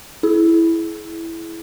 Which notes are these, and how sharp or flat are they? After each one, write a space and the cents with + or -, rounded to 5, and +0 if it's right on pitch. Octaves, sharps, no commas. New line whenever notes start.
E4 +0 G#4 +35